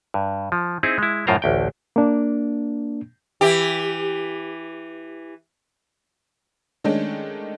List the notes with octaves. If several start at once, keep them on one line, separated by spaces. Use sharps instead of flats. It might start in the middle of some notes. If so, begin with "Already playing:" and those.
G2
F3
C4 D#4 E4 G#4
G#3 E4
F#2 A2 F4 A#4 C5 A#5
A1 D2 G5
A#3 D4
E3 G4
D#3 G#3 A3 C#4 D4